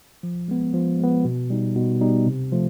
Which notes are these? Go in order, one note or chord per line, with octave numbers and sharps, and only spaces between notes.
F3
G#3 B3
F3
G#3 B3
B2
G3 B3 D#4
B2
G3 B3 D#4
C3
F3 A3